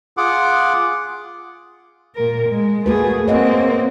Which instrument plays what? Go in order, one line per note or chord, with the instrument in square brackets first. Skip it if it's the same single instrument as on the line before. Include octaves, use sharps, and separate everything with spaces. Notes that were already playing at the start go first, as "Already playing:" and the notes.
[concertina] F4 G#4 F#5 D6
[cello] A#2 A#4
G#3
[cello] A3 G#4 [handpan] A#3 F#4 B4
[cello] A#3 C4 [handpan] C#5 D#5 F#5